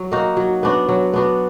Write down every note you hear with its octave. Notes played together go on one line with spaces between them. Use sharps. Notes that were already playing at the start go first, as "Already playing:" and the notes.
Already playing: F#3
A#3 D#4 F#4
F#3
B3 D4 F#4
F#3
B3 D4 F#4